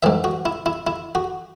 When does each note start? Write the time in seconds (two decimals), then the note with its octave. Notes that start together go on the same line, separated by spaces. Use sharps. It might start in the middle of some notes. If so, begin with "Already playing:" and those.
0.03 G#2 E3 E5
0.24 F#4
0.46 E4
0.66 E4
0.87 E4
1.15 F#4